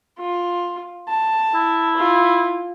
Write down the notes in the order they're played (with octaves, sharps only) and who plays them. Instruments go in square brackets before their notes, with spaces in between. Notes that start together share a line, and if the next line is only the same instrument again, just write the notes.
[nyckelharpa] F4
A5
[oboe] E4
[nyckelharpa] F4